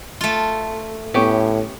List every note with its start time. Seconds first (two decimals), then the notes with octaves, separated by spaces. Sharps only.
0.21 A3 F4
1.14 A2 B3 C#4 G4